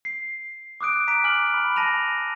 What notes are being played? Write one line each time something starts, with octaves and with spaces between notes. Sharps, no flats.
C7
D6 D#6 F#6 D7
A#5 B6 D7
G#5 D6 F6 F#6 F#7
B5
A5 A#6 D#7 F7